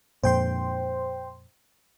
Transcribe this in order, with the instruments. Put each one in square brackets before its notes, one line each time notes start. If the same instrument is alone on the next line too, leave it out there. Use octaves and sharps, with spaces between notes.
[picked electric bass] F2 A#2 [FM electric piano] C5 G5 C6